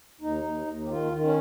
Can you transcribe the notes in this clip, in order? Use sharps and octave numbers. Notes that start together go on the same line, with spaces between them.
D#2 D#4
D#2
D#2
G4
D#3 F4
D#3
C#4